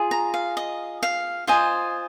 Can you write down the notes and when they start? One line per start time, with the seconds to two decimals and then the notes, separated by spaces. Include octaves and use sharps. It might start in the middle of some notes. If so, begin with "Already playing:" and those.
Already playing: F4 G#4
0.11 A#5
0.34 F5
0.57 D#5
1.03 F5
1.47 F4 C5 D#5 G#5